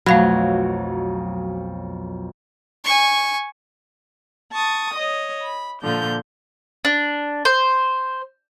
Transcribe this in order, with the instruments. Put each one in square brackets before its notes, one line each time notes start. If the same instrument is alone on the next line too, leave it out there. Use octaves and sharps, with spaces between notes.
[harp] B1 F2 [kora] F#3 [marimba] A3 F5 B5
[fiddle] G#5 C#6
[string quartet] A5 C#6 D#6
C#5 D#5
B5
A#2 D3 F3 G6
[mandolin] D4
C5